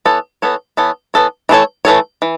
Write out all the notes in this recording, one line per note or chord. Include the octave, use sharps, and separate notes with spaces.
E3 B3 A4 C#5
E3 B3 A4 C#5
E3 B3 A4 C#5
E3 B3 A4 C#5
E3 A3 E4 A4 C#5
E3 A3 E4 A4 C#5
E3